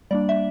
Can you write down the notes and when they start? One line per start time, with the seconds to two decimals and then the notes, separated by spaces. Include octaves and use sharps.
0.11 G3 A#3 D4 D5
0.29 E5